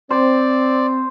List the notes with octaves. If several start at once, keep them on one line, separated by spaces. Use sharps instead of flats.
C4 C5 D5